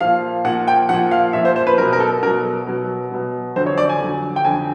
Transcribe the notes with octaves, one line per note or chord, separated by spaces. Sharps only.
A#2 F3 F5
A#2 F3 F#5
G5
A#2 F3 F#5
F5
A#2 F3 E5
C5
C5
B4
B2 F#3 A#4
A#4
A4
B2 F#3 A#4
B2 F#3
B2 F#3
F2 D3 F#3 C5
C#5
D5
G#5
F2 D3 F#3
G5
F2 D3 F#3 G#5